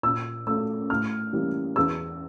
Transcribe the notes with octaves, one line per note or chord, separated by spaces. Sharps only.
A#2 E6
A3 C#4 E6
A2 F6
E3 G3 A#3 C#4
E2 E6